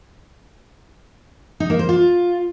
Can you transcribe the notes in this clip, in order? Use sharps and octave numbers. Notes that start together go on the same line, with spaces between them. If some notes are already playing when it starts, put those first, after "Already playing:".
D#4
A#3
C5
F4